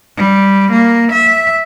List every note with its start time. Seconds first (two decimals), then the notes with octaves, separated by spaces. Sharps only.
0.17 G3
0.72 A#3
1.12 E5